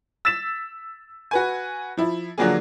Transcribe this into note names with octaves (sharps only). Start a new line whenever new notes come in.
E6 A6 B6 E7
F#4 B4 G#5
F3 E4
D3 F3 F#3 A#3 D4 G#4